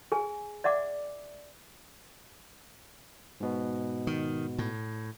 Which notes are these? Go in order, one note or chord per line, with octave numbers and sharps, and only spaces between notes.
G#4 G#5
D5 E5 F#5 D6
G#2 B2 B3
D#3
A2